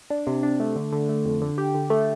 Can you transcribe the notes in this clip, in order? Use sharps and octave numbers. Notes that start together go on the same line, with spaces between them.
D4
C3
D4
A3
D3
D3
A3
F2
D3
G4
D3
A3